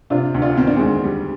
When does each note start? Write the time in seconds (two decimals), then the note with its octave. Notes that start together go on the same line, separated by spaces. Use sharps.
0.10 C3 D4 F4
0.34 D2
0.42 D4 F4
0.57 D#3 C4
0.67 D4
0.77 D2 G#3 C4
1.04 G3